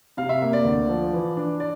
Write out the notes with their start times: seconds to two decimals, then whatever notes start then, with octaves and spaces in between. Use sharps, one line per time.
0.17 C3 F5
0.29 E5
0.42 A#3
0.53 D5
0.65 D2
0.89 F3
1.13 E3
1.37 D4
1.60 D5